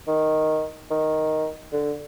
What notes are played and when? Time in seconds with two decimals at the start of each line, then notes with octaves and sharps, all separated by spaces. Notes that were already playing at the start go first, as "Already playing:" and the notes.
0.08 D#3
0.90 D#3
1.73 D3